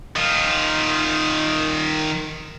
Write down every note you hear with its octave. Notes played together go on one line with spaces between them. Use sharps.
D#3 F4